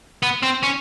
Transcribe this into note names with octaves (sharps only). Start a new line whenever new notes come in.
B3
C4
C#4